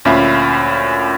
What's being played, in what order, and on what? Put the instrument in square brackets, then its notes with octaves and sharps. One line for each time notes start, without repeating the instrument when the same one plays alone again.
[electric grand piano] D2 A#2 C#4 E5 F5 B5